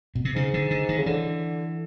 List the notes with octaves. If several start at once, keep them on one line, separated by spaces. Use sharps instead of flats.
B2
C3
G#2 C#3
D3
D3
D#3
C#3
D3 E3